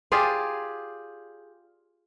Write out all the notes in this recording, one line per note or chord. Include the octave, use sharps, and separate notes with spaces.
F4 G4 G#4 D5